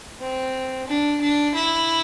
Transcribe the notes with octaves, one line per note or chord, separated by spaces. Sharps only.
C4
D4
D4
E4